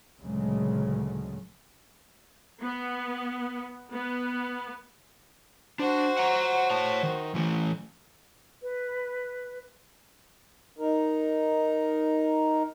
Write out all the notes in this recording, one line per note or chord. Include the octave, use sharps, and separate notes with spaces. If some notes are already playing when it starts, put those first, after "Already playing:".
D2 A#2 C#3 F#3 G#3 A3
B3
B3
D4 F#4 C5
F#5 A#5
C#5 A5
D#3
E3 A3
B4
D#4 A#4